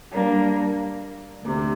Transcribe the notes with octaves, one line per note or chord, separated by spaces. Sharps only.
G3 A#3 D4
D2 C3